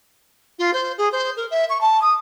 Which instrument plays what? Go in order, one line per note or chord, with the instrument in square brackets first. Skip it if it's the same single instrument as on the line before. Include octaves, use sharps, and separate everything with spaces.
[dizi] F4
C5
G#4
C5
A#4
E5
C#6
A5
D#6